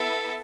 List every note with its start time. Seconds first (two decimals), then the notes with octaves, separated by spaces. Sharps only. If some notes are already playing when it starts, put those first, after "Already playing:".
Already playing: B3 E4 A4 E5